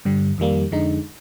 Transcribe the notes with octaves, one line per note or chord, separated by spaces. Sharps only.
G2 D3 G3
F2 D#3 G3 A#3
F2 D3 G#3 D#4